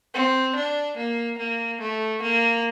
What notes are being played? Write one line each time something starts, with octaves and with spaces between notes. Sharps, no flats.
C4
D4
A#3
A#3
A3
A#3